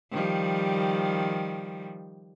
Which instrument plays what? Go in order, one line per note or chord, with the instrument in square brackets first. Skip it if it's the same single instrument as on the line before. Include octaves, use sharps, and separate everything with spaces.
[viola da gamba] D#3 F3 G3